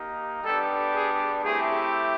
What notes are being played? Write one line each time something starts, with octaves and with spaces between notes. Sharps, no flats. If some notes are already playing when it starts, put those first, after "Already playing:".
Already playing: A#3 D#4 G4
G3 B3 D4 G4 A4
G#4
A3 C4 E4 G4 G#4